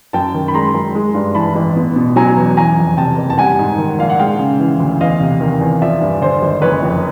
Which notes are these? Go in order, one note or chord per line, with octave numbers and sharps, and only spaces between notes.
F#2 G5 A5
D#3
B5
G#3 A#5 C6
F#2
G#3
G2
E3 A5 B5
A1
B3
B2
F#3 G#5 A#5
E2
E3 G#5 A#5
F2
C3 G5 A5
F#1
A5
G3 F#5 G#5
G#2
D#3
A#1 F5
F#5
G#3 F5 G5
C#3
E3
D2
E2 D#5 F5
C3
D#3
E2
F3 D5 E5
G2
D3 C5 D5
G#1
F#1 B4 C#5
F2